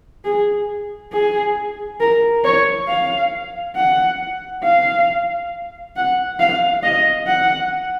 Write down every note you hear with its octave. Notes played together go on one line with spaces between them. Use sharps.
G#4
G#4
A#4
C#5
F5
F#5
F5
F#5
F5
D#5
F#5